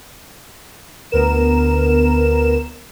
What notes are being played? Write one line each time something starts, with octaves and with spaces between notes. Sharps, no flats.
D2 B3 A#4 E7